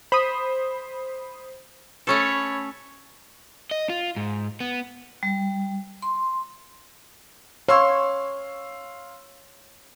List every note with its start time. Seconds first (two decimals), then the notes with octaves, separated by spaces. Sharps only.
0.12 C5 B5 D#6
2.07 A3 C#4 A4 C#5 B5
3.71 D#5
3.89 F4
4.16 G#2
4.60 B3
5.23 G3
6.02 C6
7.69 C#5 F5 C6 E6